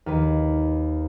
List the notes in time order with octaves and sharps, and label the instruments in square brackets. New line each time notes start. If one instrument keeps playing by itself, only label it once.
[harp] D#2 B4